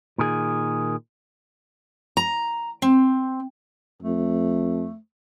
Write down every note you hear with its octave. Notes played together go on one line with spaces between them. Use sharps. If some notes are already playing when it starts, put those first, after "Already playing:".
A#2 D#3 G#4
A#5
C4
F2 A3